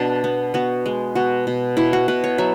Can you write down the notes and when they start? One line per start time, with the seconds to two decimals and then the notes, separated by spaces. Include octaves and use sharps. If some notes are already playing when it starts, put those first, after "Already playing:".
Already playing: B2 D4
0.24 B3
0.54 B3 F#4
0.86 G#3
1.15 B2 F#4
1.47 B2
1.77 B2 E4
1.93 F#4
2.08 B2 B4
2.24 C#5
2.38 F#3 E5